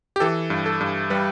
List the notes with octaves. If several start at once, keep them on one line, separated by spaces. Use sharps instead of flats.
G4
E3 A4
G2
A4
G2
G3 B4